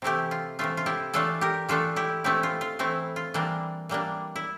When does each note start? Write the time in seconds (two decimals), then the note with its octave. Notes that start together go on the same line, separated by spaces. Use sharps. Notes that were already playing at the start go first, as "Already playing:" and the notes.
0.02 C3 E3 A3 E4 G4
0.31 F4
0.59 C3 E3 A3 F4
0.77 F4
0.86 E4 G4
1.13 E3 A3 D4 F4 A4
1.41 G4 A#4
1.69 E3 A3 D4 F4 A4
1.96 E4 G4
2.24 E3 A3 C4 E4 G4
2.43 F4
2.61 F4
2.79 E3 A3 C4 E4
3.16 F4
3.34 E3 G3 A#3 D4
3.89 E3 G3 A#3 D4
4.36 E4